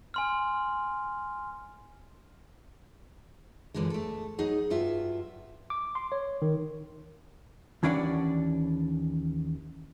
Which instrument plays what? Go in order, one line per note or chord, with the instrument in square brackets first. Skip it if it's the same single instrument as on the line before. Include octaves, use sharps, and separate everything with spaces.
[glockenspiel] G#5 C6 F6
[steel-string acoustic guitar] F#2 A#2 D3 E3 G#3
A3 A4
F#3 D#4 G#4 F#5
G2 F#3 F4 E5
[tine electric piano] D6
C6
C#5
D#3
[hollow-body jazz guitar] D#2 E3 C#4 D4 D5 F#5